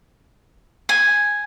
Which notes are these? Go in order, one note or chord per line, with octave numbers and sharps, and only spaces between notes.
G#5